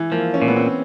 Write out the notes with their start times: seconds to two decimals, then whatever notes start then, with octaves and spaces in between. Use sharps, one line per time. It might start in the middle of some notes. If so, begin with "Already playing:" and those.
Already playing: E3
0.12 F3 A#3
0.34 C#4
0.42 A#2
0.48 B3
0.56 C4